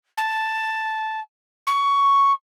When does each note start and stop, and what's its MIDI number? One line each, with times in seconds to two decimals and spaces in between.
0.17 1.20 81
1.67 2.32 85